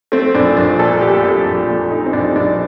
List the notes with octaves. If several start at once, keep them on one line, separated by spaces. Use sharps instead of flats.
A3 C4
A#1 D4
A#1 D4
A#2 A4
A3 G4
A4
A#1 G4
A#1
A#2
A3 D#4
C4
A#1 D4
A#1 D4